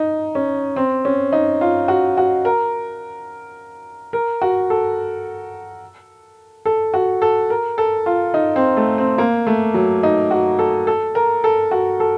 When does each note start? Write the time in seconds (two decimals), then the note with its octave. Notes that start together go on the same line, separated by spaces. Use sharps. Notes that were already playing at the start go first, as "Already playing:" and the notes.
Already playing: D#4
0.35 C#4
0.76 C4
1.05 C#4
1.33 D#4
1.61 F4
1.88 F#4
2.17 F#4
2.45 A#4
4.13 A#4
4.42 F#4
4.70 A4
6.66 A4
6.94 F#4
7.22 A4
7.50 A#4
7.78 A4
8.06 F4
8.34 D#4
8.56 C4
8.77 A3
8.98 C4
9.18 A#3
9.47 A3
9.74 F#3
10.03 D#4
10.31 F#4
10.59 A4
10.87 A4
11.15 A#4
11.44 A4
11.71 F#4
12.00 A4